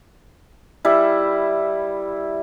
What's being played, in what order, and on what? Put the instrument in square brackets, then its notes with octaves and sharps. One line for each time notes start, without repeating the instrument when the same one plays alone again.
[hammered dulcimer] G3 E4